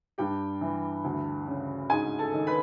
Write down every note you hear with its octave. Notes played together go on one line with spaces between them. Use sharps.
G2 G4 G5
E3
D2
C#3
G#2 G#4 G#5
A4 A5
D#3
B4 B5